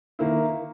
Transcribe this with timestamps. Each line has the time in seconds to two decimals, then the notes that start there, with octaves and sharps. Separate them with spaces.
0.19 D#3 A#3 E4